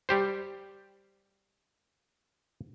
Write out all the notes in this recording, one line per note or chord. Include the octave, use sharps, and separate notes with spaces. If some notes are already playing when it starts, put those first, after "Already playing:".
G3 G4 C5